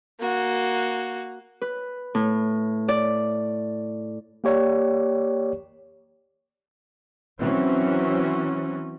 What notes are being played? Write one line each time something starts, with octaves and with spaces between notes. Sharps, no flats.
A#3 F#4
B4
A2
D5
A#3 G4 C#5 D5
E3 F#3 C4 C#4